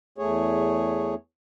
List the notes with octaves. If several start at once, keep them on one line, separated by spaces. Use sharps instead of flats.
E2 A3 G#4 C#5